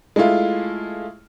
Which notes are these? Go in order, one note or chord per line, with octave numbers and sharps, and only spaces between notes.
G#3 A3 E4 F4